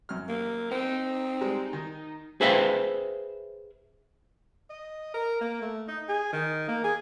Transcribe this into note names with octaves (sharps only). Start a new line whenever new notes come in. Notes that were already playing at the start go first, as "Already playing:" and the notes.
F#2 F6
A#3
C4 D#4
G3 G#3
D#3
G#4 B4 C5 E5 F5 G5
D#5
A#4
A#3
A3
D#4
G#4
D#3
A#3
G#4